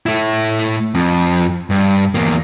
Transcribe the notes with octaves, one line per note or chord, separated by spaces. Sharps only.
A3 E4
F2
G2
E2 A#3